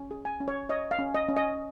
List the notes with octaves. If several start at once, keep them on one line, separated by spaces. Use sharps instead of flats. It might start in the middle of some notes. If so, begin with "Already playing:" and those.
Already playing: C#4
G#4
G#5
C#4
C#5
C#5 D#5
F5
C#4
D#5
C#4
D#5